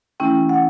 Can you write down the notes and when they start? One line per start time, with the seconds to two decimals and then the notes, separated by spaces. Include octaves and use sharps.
0.20 E3 A3 C#4 E4 G5
0.49 F#5